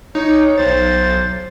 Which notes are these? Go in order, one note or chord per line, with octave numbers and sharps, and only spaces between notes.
D#4 C#5
B1 C5 A6